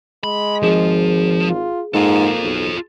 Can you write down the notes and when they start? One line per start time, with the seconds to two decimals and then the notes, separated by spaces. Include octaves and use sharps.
0.24 G#3 B5
0.62 G#1 F3 G#4
1.47 F4
1.94 G#2 A#3 F4 A4
2.43 B1